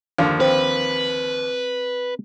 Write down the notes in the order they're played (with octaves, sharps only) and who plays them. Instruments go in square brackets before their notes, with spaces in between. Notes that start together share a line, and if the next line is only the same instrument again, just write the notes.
[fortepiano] D#2 D3 F3
[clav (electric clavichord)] C4 [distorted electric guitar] B4